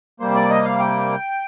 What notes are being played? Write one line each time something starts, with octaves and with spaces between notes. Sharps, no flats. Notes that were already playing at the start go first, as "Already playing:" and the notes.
C3 G3 A#3 C5
D5
D#5
F5
G5